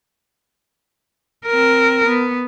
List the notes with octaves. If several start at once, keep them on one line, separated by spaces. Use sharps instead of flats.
C4 A#4
B3